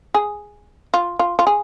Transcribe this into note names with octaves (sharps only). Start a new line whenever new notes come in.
G#4
F4
F4
F4
G#4